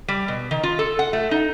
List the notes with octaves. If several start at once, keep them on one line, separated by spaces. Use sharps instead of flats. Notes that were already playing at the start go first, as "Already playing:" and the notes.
G3
B2
D#3
F4
A4
F#5
A3
D#4